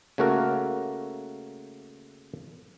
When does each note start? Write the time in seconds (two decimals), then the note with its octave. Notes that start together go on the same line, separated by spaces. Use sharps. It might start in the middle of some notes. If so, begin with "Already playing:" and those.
0.18 C#3 A3 A#3 F#4 A4 A#4